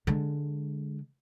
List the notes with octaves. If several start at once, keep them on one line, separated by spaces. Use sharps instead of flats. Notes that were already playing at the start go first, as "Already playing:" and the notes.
D3 G#3